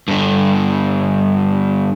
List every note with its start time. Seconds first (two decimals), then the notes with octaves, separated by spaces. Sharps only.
0.08 G2 D3